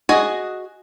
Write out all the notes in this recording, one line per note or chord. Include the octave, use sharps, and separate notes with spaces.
F#4 G#4 D#5